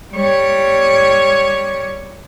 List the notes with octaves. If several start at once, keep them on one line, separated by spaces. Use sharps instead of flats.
G3 C#5